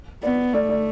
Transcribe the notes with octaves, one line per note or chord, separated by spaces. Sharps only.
B3 D5
A3 D5
D5